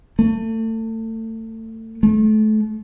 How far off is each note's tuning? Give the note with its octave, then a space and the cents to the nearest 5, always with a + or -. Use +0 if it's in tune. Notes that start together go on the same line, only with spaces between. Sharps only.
A3 +30
A3 -30